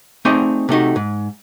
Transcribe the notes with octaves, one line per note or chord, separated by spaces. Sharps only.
A3 C4 D#4 G#4 D5 D#5
C3 A3 D#4 F#4
G#2